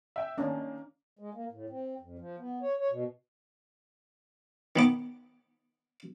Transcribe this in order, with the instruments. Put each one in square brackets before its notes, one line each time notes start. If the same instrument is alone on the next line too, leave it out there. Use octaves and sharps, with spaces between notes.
[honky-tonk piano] E5 G5
[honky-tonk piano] D#3 A#3 [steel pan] C#4 D4
[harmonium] G#3
A#3
A2
C4
F2
F3
B3
C#5
C#5
B2
[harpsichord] D#3 B3 D6